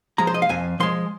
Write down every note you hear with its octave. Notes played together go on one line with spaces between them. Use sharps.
F3 G#3 A#5
C5
D#5
F5
F2 G#5
F3 G#3 C6